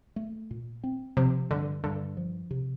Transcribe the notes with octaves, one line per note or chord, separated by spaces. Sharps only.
A3
A#2
C4
C3 F3
G2 D3
G2 D3
F3
C3